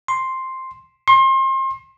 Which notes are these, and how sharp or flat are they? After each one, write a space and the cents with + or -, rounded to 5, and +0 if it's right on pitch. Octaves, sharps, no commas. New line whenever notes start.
C6 +5
C6 +35